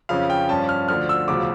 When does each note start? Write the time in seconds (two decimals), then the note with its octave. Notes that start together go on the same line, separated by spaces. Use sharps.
0.09 F2 C#3 F3 C#4 F5
0.30 G5
0.49 G2 F3 C#4 A5
0.69 F6
0.88 D2 D3 F3 F6
1.09 E6
1.28 E1 D2 C#3 F3 D6